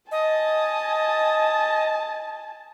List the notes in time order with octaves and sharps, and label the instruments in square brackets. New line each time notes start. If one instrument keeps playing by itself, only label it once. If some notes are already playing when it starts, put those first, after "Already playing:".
[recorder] D#5 [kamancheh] G#5 A5